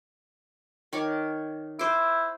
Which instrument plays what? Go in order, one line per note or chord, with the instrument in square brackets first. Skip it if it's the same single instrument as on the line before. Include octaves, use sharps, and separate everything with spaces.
[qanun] D#3 C#5 D6
[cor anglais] E4 [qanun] C5 D6